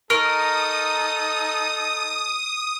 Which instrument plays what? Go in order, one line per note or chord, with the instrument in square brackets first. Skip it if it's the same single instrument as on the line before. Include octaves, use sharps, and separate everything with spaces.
[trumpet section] D#4 A4 [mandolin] A#4 [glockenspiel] C#6 F6 [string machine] D#6